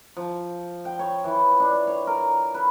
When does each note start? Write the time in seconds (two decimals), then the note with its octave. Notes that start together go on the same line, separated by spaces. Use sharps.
0.17 F3
0.85 G5
0.99 C#5
1.24 E3
1.60 D4
1.87 C#5
2.07 A#4
2.54 B4